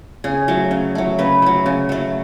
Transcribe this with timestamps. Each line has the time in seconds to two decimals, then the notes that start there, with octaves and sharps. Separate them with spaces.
0.24 C#3 G#4
0.48 F#3 A3
0.71 C#3
0.95 F#3 A3
1.18 C#3 B4
1.42 F#3 A3
1.66 C#3
1.89 F#3 A3